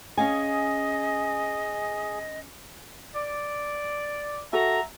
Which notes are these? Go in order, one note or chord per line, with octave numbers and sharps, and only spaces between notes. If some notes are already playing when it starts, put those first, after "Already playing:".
C#4 G#4 D#5 F5 G#5
D5
F#4 A4 E5 A#5